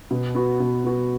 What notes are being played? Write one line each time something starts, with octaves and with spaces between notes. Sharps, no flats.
B2
B3 F#4
B2
B3 F#4